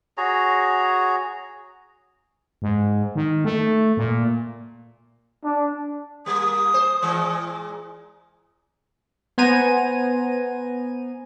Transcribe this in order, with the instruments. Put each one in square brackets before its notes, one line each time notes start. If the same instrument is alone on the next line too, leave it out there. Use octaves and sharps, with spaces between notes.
[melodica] F#4 G#4 C#5 A#5
[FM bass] G#2
D#3
A3
A#2
[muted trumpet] D4
[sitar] G3 A#3 [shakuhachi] D#6
[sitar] C5
A#2 E3 G#3
[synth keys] B3 C5 G#5 A#5 D#7